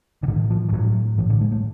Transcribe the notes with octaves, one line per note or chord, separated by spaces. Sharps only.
D3
A2 D#3
F3
F3
A2 F#3
A2 E3
D3
G#3
A3